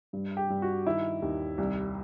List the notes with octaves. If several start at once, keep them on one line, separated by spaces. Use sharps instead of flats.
G2
G4
G2
F#4
D#3 E4
D#2
C2